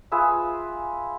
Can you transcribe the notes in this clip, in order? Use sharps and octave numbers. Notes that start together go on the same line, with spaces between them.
F4 G#4 B4 E5